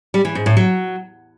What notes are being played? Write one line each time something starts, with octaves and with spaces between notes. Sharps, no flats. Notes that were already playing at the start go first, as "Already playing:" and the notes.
G3
E3
G#2
A2
F#3